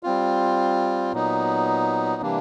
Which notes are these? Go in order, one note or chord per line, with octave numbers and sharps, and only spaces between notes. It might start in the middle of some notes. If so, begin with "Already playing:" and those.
G3 C4 F4
A#2 F#3 B3 D#4
C3 E3 G3 A#3 D4